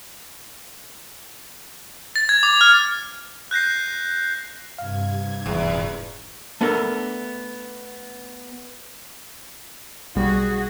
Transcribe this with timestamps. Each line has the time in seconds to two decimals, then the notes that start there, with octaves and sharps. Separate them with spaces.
2.16 A6
2.29 G#6
2.43 D6
2.61 F6
3.51 F#6 G6 A#6 C7
4.78 G2 C3 F5 G#6
5.46 D#1 E2 G#2
6.61 A3 B3 D4 A4 A#4
10.16 B1 G3 F#4 G#4